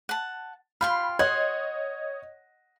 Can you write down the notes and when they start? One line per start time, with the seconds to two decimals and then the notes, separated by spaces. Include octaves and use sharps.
0.09 F#5 A5
0.81 F4 G5 B5 C6 F6
1.19 C#5 D#5 F#5 C6 G#6